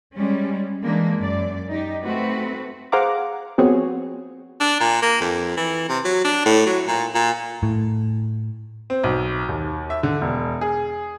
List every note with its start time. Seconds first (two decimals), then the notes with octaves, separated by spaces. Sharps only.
0.15 G3 G#3 C#4
0.84 E3 G#3 A#3 D4
1.18 F#2 D5
1.70 D#4 G4
2.04 A3 C4 F#4 B4
2.92 G#4 C5 F5 F#5 A#5 D6
3.58 F3 B3 C4 F#4 G#4 C#5
4.60 D4
4.80 A#2
5.02 A#3
5.21 F2
5.57 E3
5.89 C3
6.05 F#3
6.25 D4
6.45 A2
6.66 F#3
6.87 A#2
7.15 A#2
7.63 A2
8.90 C4
9.04 B1
9.49 D#2
9.90 E5
10.03 D3
10.21 E1
10.61 G#4